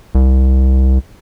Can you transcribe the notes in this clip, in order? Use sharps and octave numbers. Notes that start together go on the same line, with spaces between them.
C2